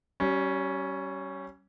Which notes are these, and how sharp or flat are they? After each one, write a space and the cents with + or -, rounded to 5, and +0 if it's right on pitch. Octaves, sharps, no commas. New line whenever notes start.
G3 -35 C#4 +0